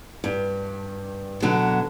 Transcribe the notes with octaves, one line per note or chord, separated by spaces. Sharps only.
G2
B2 D3 F#3